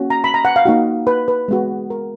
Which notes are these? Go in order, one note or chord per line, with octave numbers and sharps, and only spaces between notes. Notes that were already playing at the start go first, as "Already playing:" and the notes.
Already playing: A#3 C#4 F#4
A#5
B5
A#5
F#5
F5
A#3 D#4 F#4
B4
B4
G#3 B3 F#4
A#4